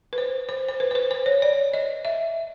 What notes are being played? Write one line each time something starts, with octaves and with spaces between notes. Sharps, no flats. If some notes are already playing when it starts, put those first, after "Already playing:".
B4
C5
C5
C5
B4
C5
B4
C5
C#5
D5
D#5
E5